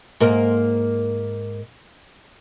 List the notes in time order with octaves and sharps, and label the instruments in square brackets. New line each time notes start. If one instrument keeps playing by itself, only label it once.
[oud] G#2 A#3 A#4